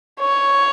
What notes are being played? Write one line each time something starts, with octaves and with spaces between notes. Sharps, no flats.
C#5